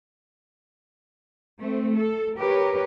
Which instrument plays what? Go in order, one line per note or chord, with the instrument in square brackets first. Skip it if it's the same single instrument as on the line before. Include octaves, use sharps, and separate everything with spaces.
[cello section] A3 C4
A4
G4 A#4 B4 C#5